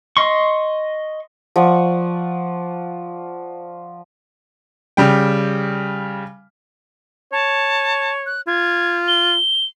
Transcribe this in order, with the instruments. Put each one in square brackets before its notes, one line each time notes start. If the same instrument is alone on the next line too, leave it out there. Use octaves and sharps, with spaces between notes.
[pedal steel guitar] D#5 C6 C#6
[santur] F3 D5 F#5 C#6
[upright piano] C#3 G3 G5
[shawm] C#5 [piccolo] A5
[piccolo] F#6
[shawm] F4 [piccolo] G#6
[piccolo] G7